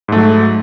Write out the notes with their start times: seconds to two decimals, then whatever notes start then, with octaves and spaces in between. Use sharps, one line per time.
0.08 G#2
0.12 A3
0.16 F#3